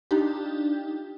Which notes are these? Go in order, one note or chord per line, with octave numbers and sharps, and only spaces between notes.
D4 D#4 F4 G4